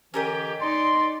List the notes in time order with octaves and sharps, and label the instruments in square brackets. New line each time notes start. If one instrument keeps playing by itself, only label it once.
[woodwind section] D3 E3 G4 [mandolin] C#4 A#4 D#5
[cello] D#4 D5 [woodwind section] C6